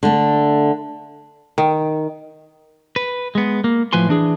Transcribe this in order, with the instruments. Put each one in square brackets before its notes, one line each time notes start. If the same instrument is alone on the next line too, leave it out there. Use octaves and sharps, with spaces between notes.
[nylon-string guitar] D3 A3
[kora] D#3
[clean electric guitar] B4
G#3 B3
A#3
A2 F3 B4 G#5 C6
E3 D4 G#4